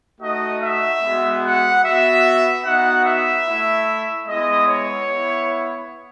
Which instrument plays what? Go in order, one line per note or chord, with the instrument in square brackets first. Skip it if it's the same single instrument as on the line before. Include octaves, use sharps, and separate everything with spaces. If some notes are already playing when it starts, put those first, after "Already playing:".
[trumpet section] A3 D#4 F#4 D#5
E5
G#3 B3 F#4
F#5
B3 F#4 E5
B3 D#4 F#4 F#5
E5
A3 E4
G#3 B3 E4 D#5
C#5
B3 E4